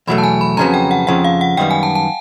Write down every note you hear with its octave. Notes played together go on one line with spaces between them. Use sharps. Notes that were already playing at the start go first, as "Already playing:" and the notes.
E2 B2 F#3 A3 B5
A5
G#5
B5
F2 C#3 F#3 B3 A#5
G5
F#5
F2 C#3 F3 F#5
F5
F#5
F#2 D#3 G3 B3 G5
G#5
A5
A5